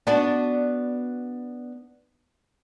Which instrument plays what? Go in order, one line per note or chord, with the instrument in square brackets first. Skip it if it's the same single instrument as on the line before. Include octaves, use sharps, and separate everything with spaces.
[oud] B3 D4 F#4